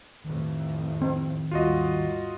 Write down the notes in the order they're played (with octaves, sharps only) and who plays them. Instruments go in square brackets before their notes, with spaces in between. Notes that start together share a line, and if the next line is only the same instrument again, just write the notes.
[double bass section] A1 F2 A2 [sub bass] D#3
[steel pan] C4
[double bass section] D#2 G#2 G3 [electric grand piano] F4 F#4 D#5